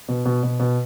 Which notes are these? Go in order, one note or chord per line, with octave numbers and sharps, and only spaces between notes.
B2
B2
B2
B2